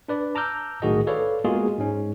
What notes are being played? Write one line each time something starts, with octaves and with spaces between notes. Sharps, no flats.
D4 B4 D5
A5 A#5 D6 E6 F6 G6
B1 A2 D#3 F#4 G#4 D#5
A4 B4 C#5 D5 F5
G#3 A#3 B3 F4 F#4 G#4
G#2 G#3 C#4